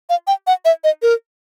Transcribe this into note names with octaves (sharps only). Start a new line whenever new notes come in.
F5
G5
F#5
E5
D#5
A#4